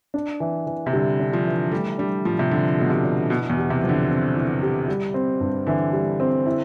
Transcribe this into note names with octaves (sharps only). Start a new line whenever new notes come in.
D4
E3
E3
C3
D3 G3
D4
F3
E3
G3 A3
G3 D4
A2 F3
C3
D3 F3
B2 A3
C3
D4
B2 E4
E2
G4
C3
F3
D3
C4
E4
G4
G3
C4
G2
D3 E3
G3
C4
E4